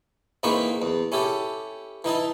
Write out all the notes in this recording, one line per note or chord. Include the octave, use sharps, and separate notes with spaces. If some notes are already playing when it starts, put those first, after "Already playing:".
G#2 E3 A#3 C4 B4 C#6
E2
C#4 E4 G4 A4
E3 D#4 E4 A5